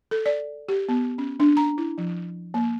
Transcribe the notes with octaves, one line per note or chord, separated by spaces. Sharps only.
A4
D5
G4
B3
C#4
D4
A#5
E4
F3
A#3